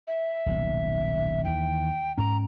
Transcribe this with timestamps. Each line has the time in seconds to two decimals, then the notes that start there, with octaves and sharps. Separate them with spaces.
0.08 E5
0.46 D#1 B1 C3
1.44 D#2 E3 G5
2.18 G#2 C#4 A#5